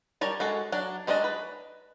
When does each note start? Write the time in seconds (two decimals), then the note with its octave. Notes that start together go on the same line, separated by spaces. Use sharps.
0.21 G3 A#4 C#5 A5
0.40 G#3 F#4 A4
0.72 F#3 D4
1.07 F#3 G#3 D4 A4 D#5
1.24 B4